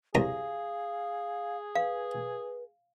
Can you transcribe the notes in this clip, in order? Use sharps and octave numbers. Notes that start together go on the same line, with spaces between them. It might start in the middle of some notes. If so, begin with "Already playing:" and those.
C2 G#4 F5 A#5
B4 F5